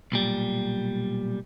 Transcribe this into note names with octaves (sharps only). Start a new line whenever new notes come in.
B1 A#2 G3